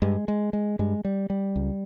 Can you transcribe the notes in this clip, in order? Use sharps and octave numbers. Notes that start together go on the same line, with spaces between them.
G2 G#3
G#3
G#3
G2 G#3
G3
G3
C#2